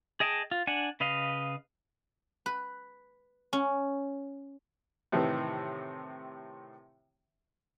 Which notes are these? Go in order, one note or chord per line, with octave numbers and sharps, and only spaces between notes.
G#4 D#5 G5 A5
F4
D4 F#5 G#5
C#3 B4 D#5 F5
B4
C#4
A2 C3 D#3 E3